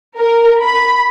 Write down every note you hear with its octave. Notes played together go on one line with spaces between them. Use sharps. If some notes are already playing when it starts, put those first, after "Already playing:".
A#4
B5